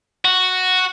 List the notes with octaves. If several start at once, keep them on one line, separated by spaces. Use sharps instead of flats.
F#4